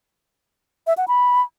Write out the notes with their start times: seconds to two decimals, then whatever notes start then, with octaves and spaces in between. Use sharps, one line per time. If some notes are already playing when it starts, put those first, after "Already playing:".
0.87 E5
0.97 F#5
1.08 B5